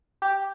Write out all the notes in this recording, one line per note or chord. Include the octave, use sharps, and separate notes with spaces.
G4